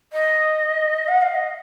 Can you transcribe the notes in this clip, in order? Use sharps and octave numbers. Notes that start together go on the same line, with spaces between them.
D#5
F#5
F5
D#5